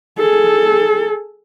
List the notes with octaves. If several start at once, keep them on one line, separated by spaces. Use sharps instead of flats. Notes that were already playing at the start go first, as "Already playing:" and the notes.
G#4 A4